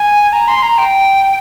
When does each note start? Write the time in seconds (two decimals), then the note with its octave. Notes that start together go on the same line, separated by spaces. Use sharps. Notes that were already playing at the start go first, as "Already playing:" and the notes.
Already playing: G#5
0.33 A#5
0.48 C6
0.63 A#5
0.78 G5